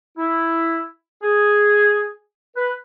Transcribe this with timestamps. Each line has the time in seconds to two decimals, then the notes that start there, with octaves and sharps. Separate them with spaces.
0.18 E4
1.23 G#4
2.56 B4